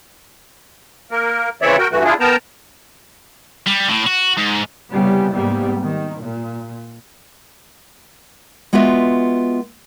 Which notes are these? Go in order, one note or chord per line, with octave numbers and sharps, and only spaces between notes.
A#3 A#4
C#3 E3 C4 C#5 D5 E5
F#4 A#4 G5
G2 E3 A3 F#4
D4 E4 F4 G#4
B3 A#4 G5 A5 A#5
G3
A2
F#4
G#2
C2 C#3 G3 B3 C#4
G#2 G3 A#3 B3
D#3
A#2
G#3 B3 F4 F#4 B4 E5